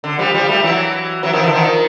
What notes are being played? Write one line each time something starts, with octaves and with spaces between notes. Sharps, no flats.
D3
F3 G3
F3 G3
G3 A3
E3 F#3
E3 F#3
D#3 F3
D3 E3
D#3 F3